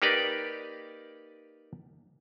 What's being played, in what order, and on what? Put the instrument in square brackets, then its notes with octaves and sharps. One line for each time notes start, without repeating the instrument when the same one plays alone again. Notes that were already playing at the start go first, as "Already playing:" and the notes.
[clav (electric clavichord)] A#3 D#4 G4 A#4 B4 D5